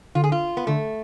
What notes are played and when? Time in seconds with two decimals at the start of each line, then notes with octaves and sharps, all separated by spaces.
0.15 D3 F4
0.24 G#4
0.32 F4
0.57 B3
0.67 D3 A3